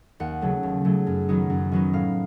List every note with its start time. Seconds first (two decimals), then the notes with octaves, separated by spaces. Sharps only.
0.20 D#2 F#5
0.41 C#3 F#3 A3
0.63 D#2
0.85 C#3 F#3 A3
1.07 F#2
1.29 D#3 F#3 B3 D#4
1.50 F#2
1.72 D#3 F#3 B3 D#4
1.93 A2 F5